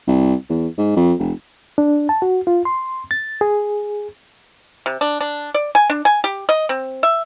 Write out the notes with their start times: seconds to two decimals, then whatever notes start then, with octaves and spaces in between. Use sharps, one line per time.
0.07 C2
0.49 E2
0.78 G#2
0.96 F2
1.19 F1
1.78 D4
2.09 A5
2.22 F#4
2.47 F4
2.65 C6
3.11 A6
3.41 G#4
4.86 C3
5.01 D4
5.21 D4
5.54 D5
5.75 G#5
5.90 D4
6.05 G#5
6.24 G4
6.49 D#5
6.69 C4
7.03 E5